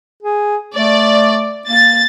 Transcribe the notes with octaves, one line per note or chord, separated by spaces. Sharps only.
G#4
A3 D5
A#3 A6